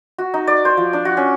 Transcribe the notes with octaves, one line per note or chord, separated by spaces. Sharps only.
F#4
D#4
D5
C5
F3
D4
F#4
C#4